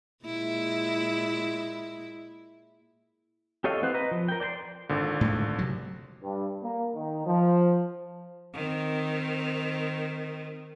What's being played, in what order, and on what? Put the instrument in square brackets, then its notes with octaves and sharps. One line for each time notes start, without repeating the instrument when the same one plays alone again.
[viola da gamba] A#2 G#3 E4
[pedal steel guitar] G4 A4 C#5 D#5 F5
E3 C4 B4 C5 F#5
B4 D#5 A#5
F3
A#4 G5
D5 G5 A5 C6
[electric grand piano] G#1 A#2 D3
[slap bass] A2 G#3
C3 F#3
[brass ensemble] G2
A#3
D#3
F3
[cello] D#3 C4